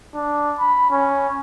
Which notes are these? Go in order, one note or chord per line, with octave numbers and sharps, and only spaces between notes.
D4
B5
C#4